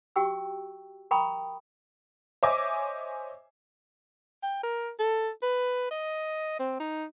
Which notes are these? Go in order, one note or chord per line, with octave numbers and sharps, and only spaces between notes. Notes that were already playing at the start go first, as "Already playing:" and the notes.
F#4 G4 G5 C#6 E6
A#4 G5 A#5 B5 C#6 D#6
C5 C#5 D#5 E5 G#5 D6
G5
A#4
A4
B4
D#5
C4
D#4